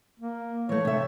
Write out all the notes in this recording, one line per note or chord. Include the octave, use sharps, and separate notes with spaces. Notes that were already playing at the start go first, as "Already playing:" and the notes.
A#3
E3 A3 C#5
C3 E5